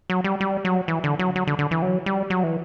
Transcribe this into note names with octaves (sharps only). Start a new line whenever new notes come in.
F#3
G3
G3
F#3
E3
D3
F#3
F#3
D3
D3
E3
F#3
G3
F#3
E3